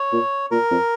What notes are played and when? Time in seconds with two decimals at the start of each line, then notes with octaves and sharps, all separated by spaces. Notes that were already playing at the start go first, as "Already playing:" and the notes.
Already playing: C#5
0.12 A#2
0.51 A#2 A#4
0.71 F2